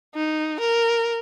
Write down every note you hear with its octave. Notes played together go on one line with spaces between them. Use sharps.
D#4
A#4